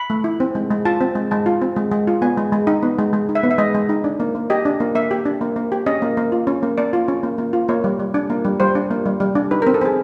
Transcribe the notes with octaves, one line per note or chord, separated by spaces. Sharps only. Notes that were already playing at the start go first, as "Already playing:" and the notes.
Already playing: B5
A3
E4
C4
G#3
G#3
F4 A5
C4
G#3
G#3 A5
F4
C4
G#3
G#3
F4
B3 G#5
G#3
G#3
D#4
B3
G#3
G#3
D#4
E5
B3
E5
G#3 D#5
G#3
D#4
D4
A#3
A#3
G4 D#5
D4
A#3
A#3 E5
G4
D4
A#3
A#3
G4
C#4 D#5
A#3
A#3
F4
C#4
A#3
A#3 D5
F4
C#4
A#3
A#3
F4
A#3 C#5
G3
G3
D4
A#3
G3
G3 C5
D4
A#3
G3
G3
D4
D#4 B4
A#4
C4
A4
C4 G#4